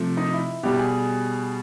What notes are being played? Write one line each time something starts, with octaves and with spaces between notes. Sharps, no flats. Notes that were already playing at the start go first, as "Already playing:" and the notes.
Already playing: C3 F3 A3
D#4
E4
B2 G3 G4
G#4